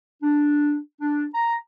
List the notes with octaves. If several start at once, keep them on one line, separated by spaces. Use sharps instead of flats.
D4
D4
A#5